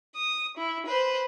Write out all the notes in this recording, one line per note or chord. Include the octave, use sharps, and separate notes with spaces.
D#6
E4
B4 C5